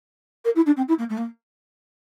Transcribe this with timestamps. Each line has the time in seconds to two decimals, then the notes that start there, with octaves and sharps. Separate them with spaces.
0.45 A#4
0.56 E4
0.66 D4
0.77 C4
0.88 E4
0.99 A#3
1.10 A3
1.18 A#3